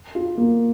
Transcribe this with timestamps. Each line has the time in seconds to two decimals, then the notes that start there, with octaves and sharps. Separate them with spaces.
0.15 F4
0.38 A#3